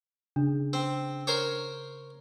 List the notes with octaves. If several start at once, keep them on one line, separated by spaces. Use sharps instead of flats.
C#3 D4
C4
A#4 C5 C#5